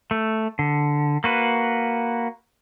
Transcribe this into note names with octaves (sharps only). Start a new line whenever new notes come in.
A3
D3
A#3 F#4 B4